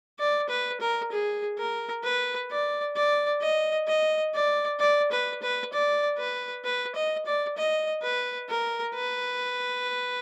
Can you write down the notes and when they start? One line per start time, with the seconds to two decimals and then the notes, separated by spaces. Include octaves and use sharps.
0.19 D5
0.49 B4
0.81 A#4
1.12 G#4
1.58 A#4
2.04 B4
2.50 D5
2.96 D5
3.41 D#5
3.87 D#5
4.35 D5
4.80 D5
5.11 B4
5.42 B4
5.73 D5
6.18 B4
6.64 B4
6.95 D#5
7.26 D5
7.57 D#5
8.03 B4
8.49 A#4
8.95 B4